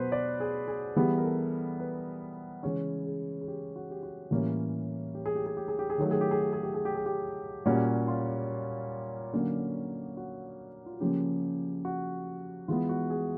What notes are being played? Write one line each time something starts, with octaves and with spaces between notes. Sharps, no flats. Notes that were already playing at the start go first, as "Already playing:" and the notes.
Already playing: B2 F#3 B3 B4 C5
D5
G#4
G#4
E3 G3 B3 G#4
A#4
A4
B4
C#3 E3 G#3 C#4 C#5
G#4
G#4
G4
F#4
G4
F#4
A2 E3 G3 A#3 C#4
G4
G#4
G4
G#4
G4
G#4
G4
G#4
D#3 F#3 A3 G4
G#4
G4
G#4
G4
G#4
G4
G#4
G4
G#4
G4
A#2 G3 A#3 C#4 F#4
F4
D3 F#3 A#3 C#4
F#4
F4
F#4
C#3 F3 A#3 G4
F#4
E3 G#3 B3 F4
F#4
G#4